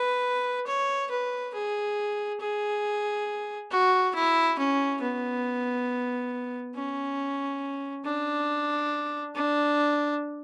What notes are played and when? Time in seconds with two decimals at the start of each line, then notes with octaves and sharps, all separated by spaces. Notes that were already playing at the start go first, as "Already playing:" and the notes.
Already playing: B4
0.67 C#5
1.10 B4
1.54 G#4
2.40 G#4
3.71 F#4
4.15 E4
4.58 C#4
5.02 B3
6.75 C#4
8.04 D4
9.35 D4